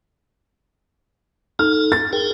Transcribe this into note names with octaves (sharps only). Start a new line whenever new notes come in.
D#4 A4 F6
A6
G#4 A#4 G5